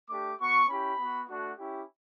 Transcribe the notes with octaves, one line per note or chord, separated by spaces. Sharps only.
A3 D4 G4 D6
B3 F#4 C#6
C#4 E4 G4 B5
B3 F#4
A3 D4 F#4
C#4 E4 G4